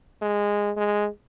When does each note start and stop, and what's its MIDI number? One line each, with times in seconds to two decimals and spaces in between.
0.22 0.72 56
0.77 1.08 56